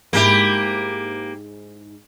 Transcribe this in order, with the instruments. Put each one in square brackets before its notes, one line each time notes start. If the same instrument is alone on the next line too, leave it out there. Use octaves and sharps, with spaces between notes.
[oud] G#2 E4 [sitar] A#3 G4